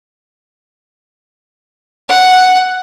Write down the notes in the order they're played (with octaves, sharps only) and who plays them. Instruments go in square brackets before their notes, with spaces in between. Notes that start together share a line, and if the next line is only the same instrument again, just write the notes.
[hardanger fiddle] F#5